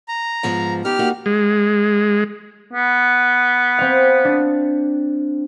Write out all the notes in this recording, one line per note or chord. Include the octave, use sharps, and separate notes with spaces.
A#5
G#2 F3 B3
B3 D#4 G4 F6
A#3 D#4 F#4
G#3
B3
C4 F5
D4